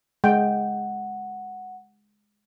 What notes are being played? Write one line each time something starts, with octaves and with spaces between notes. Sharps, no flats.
G#3 F#5 G5